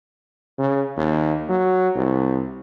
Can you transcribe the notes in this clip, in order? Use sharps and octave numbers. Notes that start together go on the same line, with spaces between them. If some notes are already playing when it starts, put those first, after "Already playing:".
C#3
D#2
F#3
C2